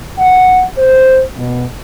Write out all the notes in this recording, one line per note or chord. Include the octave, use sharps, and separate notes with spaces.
F#5
C5
B2